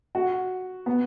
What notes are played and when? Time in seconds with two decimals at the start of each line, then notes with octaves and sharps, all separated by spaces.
0.15 F#4
0.86 B3